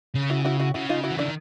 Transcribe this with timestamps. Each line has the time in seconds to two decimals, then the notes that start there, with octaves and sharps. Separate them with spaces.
0.15 C#3
0.30 E4 F#4
0.45 E4 F#4
0.60 E4 F#4
0.74 C#3 E4 F#4
0.89 D#4 F4
1.04 E4 F#4
1.11 E3
1.19 D#3 D4 E4